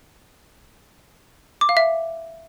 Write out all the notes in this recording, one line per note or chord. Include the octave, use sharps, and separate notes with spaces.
D6
F5
E5